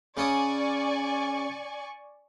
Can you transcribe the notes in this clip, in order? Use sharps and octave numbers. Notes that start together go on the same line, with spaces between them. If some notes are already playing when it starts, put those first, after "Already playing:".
C#3 C#4 D5 G#5 C#6 D#6